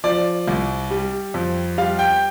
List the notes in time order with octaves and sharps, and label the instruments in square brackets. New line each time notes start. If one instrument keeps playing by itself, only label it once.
[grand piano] F3 D5
C2
G3
F2
G3 F5
G5